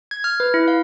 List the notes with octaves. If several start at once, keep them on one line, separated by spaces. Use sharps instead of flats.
G#6
F6
B4
E4
F5